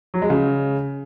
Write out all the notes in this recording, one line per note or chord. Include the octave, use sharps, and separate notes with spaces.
F#3
G#3
C#3